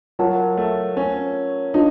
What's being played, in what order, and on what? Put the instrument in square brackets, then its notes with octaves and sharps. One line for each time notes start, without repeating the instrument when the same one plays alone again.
[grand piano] F#3 [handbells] F4 A#4 C#5 F#5 A5
[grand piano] A3
C#4
[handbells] D4 F4 [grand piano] D#4